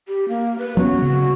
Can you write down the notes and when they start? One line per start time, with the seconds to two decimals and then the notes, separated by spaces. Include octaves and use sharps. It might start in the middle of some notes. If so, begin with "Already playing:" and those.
0.08 G4
0.29 A#3
0.59 B4
0.77 F#3 B3 C#4 F#4
1.02 C#3